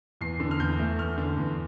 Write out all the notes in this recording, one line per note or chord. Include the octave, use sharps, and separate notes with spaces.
E2 C7
D3
F6
E2 G6
A3
E2 F6
D3
E2